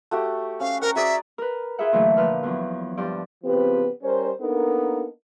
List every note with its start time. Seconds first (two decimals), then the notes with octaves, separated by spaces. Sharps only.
0.11 A3 F#4 G4
0.60 C#4 F5
0.82 A#4 F#5 A#5
0.95 F#4 G#4 D5 E5
1.38 A#4 B4
1.78 F4 G#4 B4 E5 F#5
1.93 A#2 D3 E3 F#3 A3
2.17 A#2 F3 B4 F6
2.43 E2 F3 F#3
2.97 G2 F3 D5
3.44 C#3 F3 B3 C4 G4 B4
4.03 G3 C#4 A#4 C5
4.41 A#3 B3 D4 D#4 A4 A#4